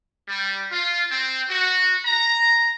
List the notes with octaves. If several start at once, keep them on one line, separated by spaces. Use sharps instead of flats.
G3
F4
C4
F#4
A#5